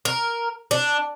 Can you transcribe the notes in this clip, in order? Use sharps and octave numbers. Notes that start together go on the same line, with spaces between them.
A#4
D4